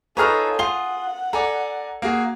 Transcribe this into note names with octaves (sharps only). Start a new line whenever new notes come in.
D#4 F4 G#4 A4 B4 C#5 A#5 F6
F4 G#4 F#5 G7
A4 D5 G#5 A#5
A#3 F#4 G#4